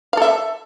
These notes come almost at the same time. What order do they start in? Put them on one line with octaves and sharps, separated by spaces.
F5 A4 E5